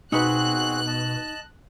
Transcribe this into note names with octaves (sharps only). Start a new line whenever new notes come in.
B2 C4 D#4 F#4 G#4 B4 F#6
D#5 A5